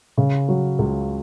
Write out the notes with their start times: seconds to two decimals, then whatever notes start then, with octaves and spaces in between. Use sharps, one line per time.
0.17 C#3
0.49 F#3
0.79 C#2